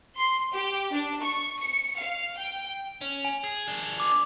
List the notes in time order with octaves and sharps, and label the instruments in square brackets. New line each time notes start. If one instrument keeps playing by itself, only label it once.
[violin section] C6
G4
D4
C#6
C#7
F5
G5
[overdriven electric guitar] C#4
[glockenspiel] G#5
[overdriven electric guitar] G#4
D4 G#4
[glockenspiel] D6